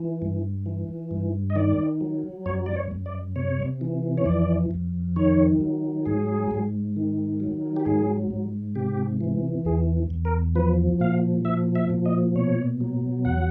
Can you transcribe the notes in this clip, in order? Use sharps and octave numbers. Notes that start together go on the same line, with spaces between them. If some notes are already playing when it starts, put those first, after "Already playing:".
Already playing: E3
G2
E3
G2
D#5
D#3 D5
F#3
F#2 C#5
D5
C#5
F#2
D5
C3 C#5
E3
C#5
F2 D5
F2
D#3 C#5
F#3
G#2 G#4
G#2
D#3
F#3
G4
G#2 G#4
G#2
C3 G4
E3
E2 G#4
E2
A#4
F3 B4
A#2 F5
F3 E5
E5
A#2
D#5
B2 C#5
F#3
E2 F#5